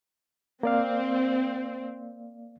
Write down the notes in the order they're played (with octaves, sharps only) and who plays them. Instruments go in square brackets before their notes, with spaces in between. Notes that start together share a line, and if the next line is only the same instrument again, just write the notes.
[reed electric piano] A#3 D5 F5 [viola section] C4